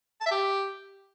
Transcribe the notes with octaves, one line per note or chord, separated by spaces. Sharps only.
A5
E5
G4